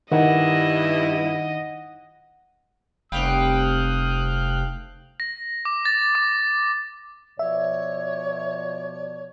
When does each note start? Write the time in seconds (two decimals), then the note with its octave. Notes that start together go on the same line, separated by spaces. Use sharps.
0.11 G2 D#3 D#4 E4 D#5 F#5
3.12 F1 G3 A3 C4 F5 G5 D#6 F#6
5.20 A#6
5.65 D6
5.85 A6
6.15 D6
7.39 B2 F3 C#5 D5 E5